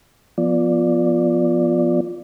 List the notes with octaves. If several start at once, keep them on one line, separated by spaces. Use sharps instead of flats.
F3 B3 F4 D5